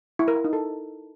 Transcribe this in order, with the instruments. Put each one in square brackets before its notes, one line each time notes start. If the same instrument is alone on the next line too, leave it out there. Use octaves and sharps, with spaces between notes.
[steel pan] E4
A#4
E4
D#4
A4